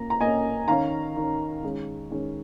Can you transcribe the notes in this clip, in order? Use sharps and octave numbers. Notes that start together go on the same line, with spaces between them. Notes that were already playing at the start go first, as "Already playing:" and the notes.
Already playing: A#2 A#3 C#4 A#5
A#5
A#2 A#3 C#4 D#5 G#5
D#3 C#4 F5 A#5
D#3 C#4
D#3 G#3 C#4
D#3 G#3 C#4